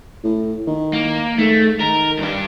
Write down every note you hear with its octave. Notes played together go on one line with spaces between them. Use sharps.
A2
D#3
A#3
G#2 A3
D#3 A#4
G2 G4